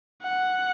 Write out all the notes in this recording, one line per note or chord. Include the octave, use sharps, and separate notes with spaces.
F#5